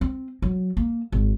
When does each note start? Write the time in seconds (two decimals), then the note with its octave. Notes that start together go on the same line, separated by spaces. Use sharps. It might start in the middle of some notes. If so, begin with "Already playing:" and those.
0.01 C4
0.42 F#3
0.77 A#3
1.12 G#1